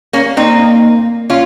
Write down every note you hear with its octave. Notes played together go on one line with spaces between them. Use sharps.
A#3 C#4
A#3 C4 D#4
C#4 F4